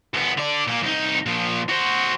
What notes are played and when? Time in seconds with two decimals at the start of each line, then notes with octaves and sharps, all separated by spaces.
0.13 D2 B3
0.38 D3 D5
0.67 A#2 A#3
0.83 C2 D#4
1.26 A#2 F3
1.69 F#4 C5